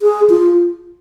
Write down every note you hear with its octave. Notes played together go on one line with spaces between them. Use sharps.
G#4
F4